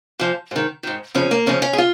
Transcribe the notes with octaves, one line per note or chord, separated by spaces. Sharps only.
A#2 F3
G#2 D#3
G#2 D#3
F2 C#3 F3 C#4
A#3
F2 C#3 F3 C#4
C#4
G#4
F4